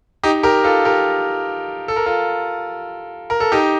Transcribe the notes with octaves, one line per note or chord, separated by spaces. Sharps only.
D#4 G4
G4 A#4
F4 A4
G4 A#4
A4
A#4
F4 A4
A#4
A4
D#4 G4